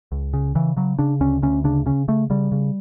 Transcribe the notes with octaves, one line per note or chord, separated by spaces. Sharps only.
C#2
C#3
C#3 E3
C#3 F#3
C#3 D4
D2 C#4
D2 C#4
C#3 D4
C#3 C#4
C#3 A3
C#3 G3
C#3